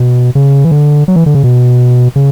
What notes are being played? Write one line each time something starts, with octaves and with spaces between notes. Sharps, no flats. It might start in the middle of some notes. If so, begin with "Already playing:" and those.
Already playing: B2
C#3
E3
D3
F#3
E3
D3
C#3
B2
C#3